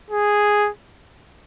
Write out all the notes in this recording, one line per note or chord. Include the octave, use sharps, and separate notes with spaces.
G#4